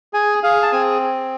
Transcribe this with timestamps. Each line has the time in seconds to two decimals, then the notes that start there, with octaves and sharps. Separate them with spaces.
0.13 G#4 G#5
0.43 G#4 F5
0.63 A5
0.72 C4 G#5